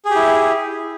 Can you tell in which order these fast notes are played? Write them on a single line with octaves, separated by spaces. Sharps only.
G#4 G4 E4